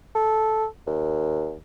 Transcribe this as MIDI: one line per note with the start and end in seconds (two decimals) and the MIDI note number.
0.15 0.66 69
0.87 1.56 39